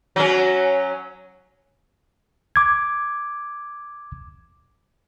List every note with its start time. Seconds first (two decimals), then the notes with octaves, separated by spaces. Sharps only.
0.16 F#3 C#4
2.56 D6 G#6